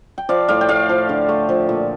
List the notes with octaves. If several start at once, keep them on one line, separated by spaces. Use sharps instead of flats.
G5
F3 D5 F5
A2 D5 F5
G5
A3 D5 F5
F3
D3
A3
F3
A#2